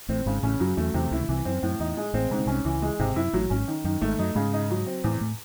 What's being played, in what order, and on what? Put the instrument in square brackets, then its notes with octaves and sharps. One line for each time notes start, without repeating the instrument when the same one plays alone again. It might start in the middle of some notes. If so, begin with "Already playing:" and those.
[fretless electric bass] A1 A2 [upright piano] C4
[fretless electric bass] G#1 G#2 [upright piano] C#3
[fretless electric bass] A1 A2 [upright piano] C#4
[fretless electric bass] F#2 [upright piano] F#3
[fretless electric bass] E2 [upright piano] A3
[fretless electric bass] E2 [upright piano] C3
[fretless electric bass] C#2 C#3 [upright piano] E4
[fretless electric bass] C#3
[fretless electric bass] C2 C3 [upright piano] E3
[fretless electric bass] F#2 [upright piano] C4
[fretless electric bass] F#2 [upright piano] A2
[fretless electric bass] E2 [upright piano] D#4
[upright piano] G#3
[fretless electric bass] A1 A2 [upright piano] C4
[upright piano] G#2 [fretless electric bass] C3
[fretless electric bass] C#3
[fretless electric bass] C2 C3 [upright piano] C#4
[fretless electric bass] C#2 C#3 [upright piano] E3
[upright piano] G#3
[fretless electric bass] G#1 G#2 [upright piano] C3
[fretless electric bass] F#2 [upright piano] E4
[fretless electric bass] A1 A2 [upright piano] F#3
[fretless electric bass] G#1 G#2 [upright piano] C#4
[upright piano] D#3
[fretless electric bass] F#2 [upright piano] D#3
[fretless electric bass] G#1 G#2 [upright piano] A3
[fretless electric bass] F#2 F#3 [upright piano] D#4
[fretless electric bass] G#2 G#3 [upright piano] C#3
[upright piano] D#4
F#3
C4
[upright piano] E2 [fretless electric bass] A2 A3
[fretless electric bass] A2 A3